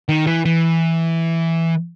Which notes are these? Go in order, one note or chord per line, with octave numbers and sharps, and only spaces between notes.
D#3
E3
E3